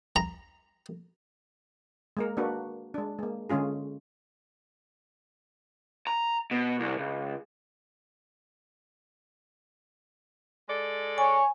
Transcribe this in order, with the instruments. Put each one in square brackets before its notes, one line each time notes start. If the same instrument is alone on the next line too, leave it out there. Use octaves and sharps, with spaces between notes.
[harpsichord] A#5
[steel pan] G#3 A#3 A#4
A#3 D4 F#4 B4
G#3 D4
G#3 A#3
D3 G#3 C#4 F4 G#4
[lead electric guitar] A#5
B2
C2
C#2
[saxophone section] G#3 A4 D5
[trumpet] C#5 [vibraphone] G#5